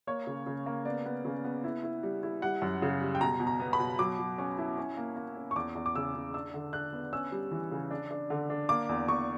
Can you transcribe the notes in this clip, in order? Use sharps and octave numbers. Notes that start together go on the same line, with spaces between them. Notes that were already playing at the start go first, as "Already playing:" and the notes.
A#3 C#5
C#3
C#3
A#3
B3 D5
B3
C#3
B3
E4
E4
G3
E4
G3 F#5
F#2
C#3
G3
G5
B2 A#5
B2
A#5
B3
B5
B2
F#3 D6
F#3
C#4
E4
C#4
A#3
A#3
C#4
C#6
E2 D6
E2
D6
C#3 E6
C#3
D4 E6
D3
D4 F#6
B3
C#4 E6
G3
E3
C#3
D4
D4
D3
D4
A#3 D6
E2
E2 C#6